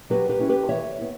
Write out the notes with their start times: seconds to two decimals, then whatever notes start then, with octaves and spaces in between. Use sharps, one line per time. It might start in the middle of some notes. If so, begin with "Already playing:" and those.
0.10 F#3 G4 B4
0.29 G4 B4
0.39 C#4 E4
0.49 G4 B4
0.69 E3 C#5 E5
0.98 B3 E4